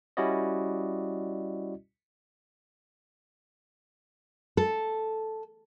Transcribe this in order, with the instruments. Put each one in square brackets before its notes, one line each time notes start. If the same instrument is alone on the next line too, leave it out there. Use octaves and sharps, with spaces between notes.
[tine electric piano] G3 C#4 E4 F#4 D5 D#5
[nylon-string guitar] A4